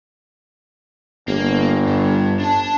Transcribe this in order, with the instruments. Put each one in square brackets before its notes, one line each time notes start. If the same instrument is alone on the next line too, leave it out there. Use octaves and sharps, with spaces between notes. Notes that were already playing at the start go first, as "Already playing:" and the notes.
[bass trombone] G1 [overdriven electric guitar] A#3
[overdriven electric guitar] G2
D4 A5